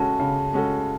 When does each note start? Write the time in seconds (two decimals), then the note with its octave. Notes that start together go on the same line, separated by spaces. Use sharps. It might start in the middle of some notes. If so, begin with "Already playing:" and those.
Already playing: C#3 G#3 C#4 F#4 A4 A5
0.20 C#3
0.53 G#3 C#4 F#4 A4